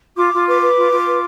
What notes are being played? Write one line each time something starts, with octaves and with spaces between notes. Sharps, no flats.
F4 D6
F4
B4 D6
B4
F4
F4
B4